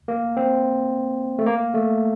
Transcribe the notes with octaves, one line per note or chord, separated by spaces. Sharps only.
A#3
C4
A3
A#3
A3